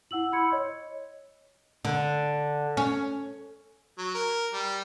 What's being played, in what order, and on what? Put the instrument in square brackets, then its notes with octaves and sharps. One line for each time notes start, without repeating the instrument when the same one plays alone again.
[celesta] E4 F#5 E6 F#7
B5 C6 E6 G6 G#6 C#7
C#5 D#5
[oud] D3
C#4
[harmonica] F#3
A#4
G3